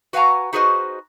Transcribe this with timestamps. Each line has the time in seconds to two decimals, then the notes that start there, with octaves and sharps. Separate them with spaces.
0.13 F#4 B4 F5 F#5 G#5 A#5
0.53 D#4 F#4 G#4 B4 C5 D#5